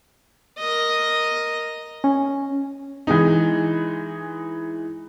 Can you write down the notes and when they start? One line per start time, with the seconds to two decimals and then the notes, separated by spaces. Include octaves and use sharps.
0.58 A#4 D#5
2.04 C#4
3.07 E3 G#3 D#4